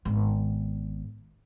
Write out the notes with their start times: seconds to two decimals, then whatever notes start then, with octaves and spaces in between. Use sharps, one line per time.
0.05 G#1 B3